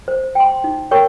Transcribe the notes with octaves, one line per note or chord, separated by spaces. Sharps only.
C5
G5 C6
D#4
A#4 C#5 G5 C#6